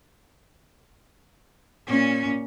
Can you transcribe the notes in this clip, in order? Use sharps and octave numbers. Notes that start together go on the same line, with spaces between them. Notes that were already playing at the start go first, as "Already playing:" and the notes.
A#2 C#4